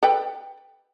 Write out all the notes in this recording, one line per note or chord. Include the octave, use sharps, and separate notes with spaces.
A4 B4 G5